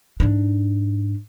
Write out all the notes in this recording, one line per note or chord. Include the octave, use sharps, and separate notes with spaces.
G#2 D4